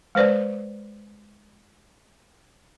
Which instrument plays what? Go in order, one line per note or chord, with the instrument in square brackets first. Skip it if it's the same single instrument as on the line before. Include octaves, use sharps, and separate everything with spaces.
[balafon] G#3 B4 C5 D5